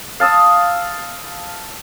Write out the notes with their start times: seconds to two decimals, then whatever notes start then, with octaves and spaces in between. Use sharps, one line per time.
0.20 F5 A5 D#6 E6